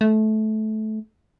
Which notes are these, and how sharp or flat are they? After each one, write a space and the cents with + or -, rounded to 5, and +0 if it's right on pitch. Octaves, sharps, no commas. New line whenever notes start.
A3 -20